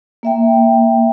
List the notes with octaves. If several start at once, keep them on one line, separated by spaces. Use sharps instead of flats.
A#3 E5 G5